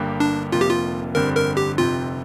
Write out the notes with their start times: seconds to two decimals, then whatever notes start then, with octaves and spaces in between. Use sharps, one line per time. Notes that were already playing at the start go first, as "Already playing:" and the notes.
Already playing: G1 G2 G3 A#3 G4
0.20 D4
0.52 F1 F2 F3 A#3 F4
0.61 G4
0.69 F4
1.15 G1 F2 D3 G3 C4 A#4
1.36 A#4
1.57 G4
1.78 F1 F2 C3 F4